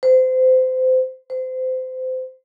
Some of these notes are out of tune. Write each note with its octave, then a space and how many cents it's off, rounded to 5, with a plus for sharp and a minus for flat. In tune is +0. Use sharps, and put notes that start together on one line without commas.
C5 -25
C5 -25